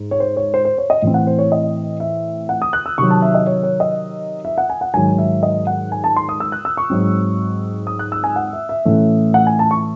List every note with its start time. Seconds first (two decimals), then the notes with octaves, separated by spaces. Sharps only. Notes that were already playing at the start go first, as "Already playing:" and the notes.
Already playing: G#2
0.11 C#5
0.20 C5
0.37 C#5
0.54 C5
0.65 C5
0.78 C#5
0.90 D#5
1.02 A2 E3 C4
1.14 F#5
1.27 C5
1.39 C#5
1.52 D#5
2.00 E5
2.49 F#5
2.62 D#6
2.73 F#6
2.86 E6
2.98 C3 D#3 F#3 C#6
3.10 A5
3.22 E5
3.34 D#5
3.47 C#5
3.63 C#5
3.80 D#5
4.45 E5
4.58 F#5
4.70 G#5
4.81 F#5
4.94 G#2 D#3 F#3 G#5
5.18 E5
5.43 D#5
5.67 F#5
5.92 G#5
6.04 A5
6.16 C6
6.29 D#6
6.40 E6
6.52 F#6
6.65 E6
6.77 C#6
6.90 G#2 F#3 C4
7.87 D#6
7.99 F#6
8.12 E6
8.24 G#5
8.36 F#5
8.53 E5
8.69 E5
8.85 A2 E3 A3 C#4
9.34 F#5
9.47 G#5
9.59 A5
9.71 C#6